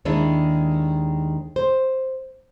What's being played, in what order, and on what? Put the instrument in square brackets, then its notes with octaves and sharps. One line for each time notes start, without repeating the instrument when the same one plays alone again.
[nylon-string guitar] D#2 D#3 G#3 D4 E4
C5